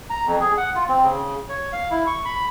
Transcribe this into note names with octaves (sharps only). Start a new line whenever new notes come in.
A#5
F2
G#4
F#5
F4
C4
C#3
C#5
F5
E4
C#6
B5